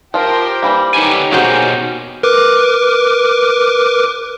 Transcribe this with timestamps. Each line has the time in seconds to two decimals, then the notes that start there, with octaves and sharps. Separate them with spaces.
0.14 F3 F4 G4 A#4 C5
0.62 E3 G3 A#3
0.94 D3 D#4 G4 B4 C#5 G#5
1.32 B2 A#3 C#4 F#4 G#4 C5
2.23 A#4 B4 D6